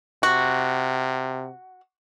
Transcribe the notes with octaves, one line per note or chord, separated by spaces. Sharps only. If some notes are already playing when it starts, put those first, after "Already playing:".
C3 F#4